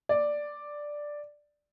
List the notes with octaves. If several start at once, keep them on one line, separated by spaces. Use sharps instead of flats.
D5